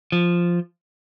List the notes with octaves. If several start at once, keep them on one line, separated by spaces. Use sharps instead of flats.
F3